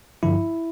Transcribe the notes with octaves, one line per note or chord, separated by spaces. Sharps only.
G2 D3 F3 E4